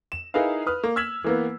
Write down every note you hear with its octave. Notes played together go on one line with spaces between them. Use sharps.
E7
D#4 E4 G#4 A#4 B4 F5
B4 D#6 F6
A#3
E6 F6 G#6 B6 E7 F#7
E3 A#3 B3